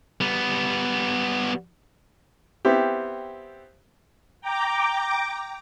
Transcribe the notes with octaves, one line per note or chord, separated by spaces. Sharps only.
G3 B3
B3 C4 E4 G4
G5 A#5 D6